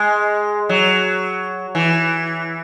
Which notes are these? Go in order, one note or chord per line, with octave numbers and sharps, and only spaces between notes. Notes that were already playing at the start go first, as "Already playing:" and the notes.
Already playing: G#3
F#3
E3